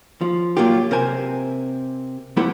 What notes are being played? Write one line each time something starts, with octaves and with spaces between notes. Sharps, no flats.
F3
A#2 F#3 A#3 F4 G4
C3 A#4 C5 G#5
F2 A3 E4 G4 B4 F#5